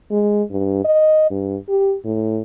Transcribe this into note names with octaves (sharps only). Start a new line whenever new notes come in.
G#3
G2
D#5
G2
G4
A2